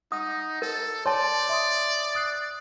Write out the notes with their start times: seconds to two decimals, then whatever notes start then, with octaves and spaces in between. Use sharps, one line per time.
0.12 D#4 F#5 D#6
0.62 A4 A#4
1.06 C#5 D5 A5 C6
1.49 E5 C6 D#6
2.15 D#6 F#6 C7